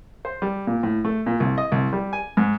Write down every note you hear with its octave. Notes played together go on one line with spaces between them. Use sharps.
C5
G3
A#2
A2
A3
A#2
C2
D#5
C2
G3
G#5
G#2